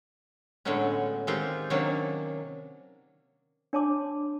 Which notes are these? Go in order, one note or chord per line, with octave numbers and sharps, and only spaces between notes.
A2 D3 F#3 G#3 B3 C#4
D#3 G#3 C4 F4 G4
C3 D#3 F#3 A#3 C#4 D4
D4 C#5 A5 C6 D6